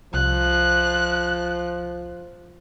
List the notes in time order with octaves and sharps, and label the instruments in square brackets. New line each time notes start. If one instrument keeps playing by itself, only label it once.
[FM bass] C2 [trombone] F3 [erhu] F#6